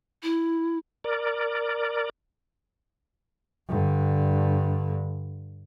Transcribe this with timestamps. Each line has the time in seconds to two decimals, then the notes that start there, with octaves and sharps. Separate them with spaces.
0.23 E4
1.04 A#4 D5
3.68 G2 D3